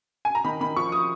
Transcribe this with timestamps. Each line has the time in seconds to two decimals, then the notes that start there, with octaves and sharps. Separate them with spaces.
0.25 G#5
0.35 A#5
0.44 D#3 B5
0.61 D#3 B5
0.76 F3 C#6
0.92 D#6